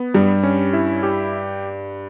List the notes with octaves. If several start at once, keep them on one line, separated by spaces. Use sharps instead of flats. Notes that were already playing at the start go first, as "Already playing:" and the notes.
Already playing: B3
G2 G3
C#4
E4
G4